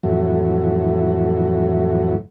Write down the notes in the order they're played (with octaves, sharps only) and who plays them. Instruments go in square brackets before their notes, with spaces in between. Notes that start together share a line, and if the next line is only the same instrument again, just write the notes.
[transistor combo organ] F2 A2 E3 F#3